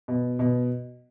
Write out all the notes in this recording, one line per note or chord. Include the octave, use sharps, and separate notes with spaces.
B2
B2